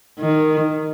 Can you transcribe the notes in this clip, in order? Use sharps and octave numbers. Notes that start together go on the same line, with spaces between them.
D#3